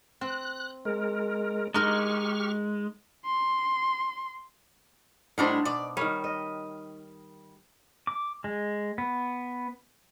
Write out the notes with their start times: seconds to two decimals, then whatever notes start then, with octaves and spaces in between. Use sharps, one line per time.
0.21 C4 F#6
0.85 G#3 A#4
1.74 G#3 D#4 G4 A#4 C#6 F6
3.26 C6
5.38 A2 G3 D4 D#4 F#4 C5
5.65 B2 D5
5.97 D#3 G3 A#4 C#5
6.24 D#5
8.07 D6
8.44 G#3
8.98 B3